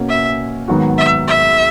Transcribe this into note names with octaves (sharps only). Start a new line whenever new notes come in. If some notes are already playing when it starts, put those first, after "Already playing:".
Already playing: B2 A#3 C#4
E5
G#2 D#3 F#3 B3 F#4
E5
E5